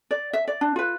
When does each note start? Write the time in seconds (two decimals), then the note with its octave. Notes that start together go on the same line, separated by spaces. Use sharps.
0.11 D5
0.33 E5
0.48 D5
0.61 D4
0.76 F4 B4